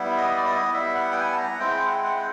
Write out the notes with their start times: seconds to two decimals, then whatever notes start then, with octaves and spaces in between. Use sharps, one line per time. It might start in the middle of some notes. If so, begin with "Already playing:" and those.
Already playing: G3 B3 E4
0.17 D#5
0.37 D5
0.45 D#5
0.73 G3 B3 E4 E5
0.95 F#5
1.12 G5
1.16 G#5
1.32 A5
1.38 A#5
1.55 F#5
1.58 G#3 C4 E4 G5
1.87 F#5
1.95 G5
2.04 F#5
2.16 G5